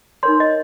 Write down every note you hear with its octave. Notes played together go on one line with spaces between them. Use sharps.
D#4 A#4 C#5 C6
D#5